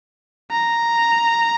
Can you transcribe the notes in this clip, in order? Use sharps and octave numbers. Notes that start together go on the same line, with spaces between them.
A#5